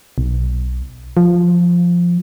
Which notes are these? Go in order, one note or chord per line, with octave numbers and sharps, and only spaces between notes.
B1
F3